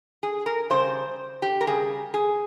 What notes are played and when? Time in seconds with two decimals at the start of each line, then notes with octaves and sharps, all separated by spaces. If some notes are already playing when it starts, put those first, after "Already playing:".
0.23 G#4
0.46 A#4
0.70 C#3 G3 C5
1.42 G4
1.61 A#4
1.67 C#3 G3 G#4
2.14 G#4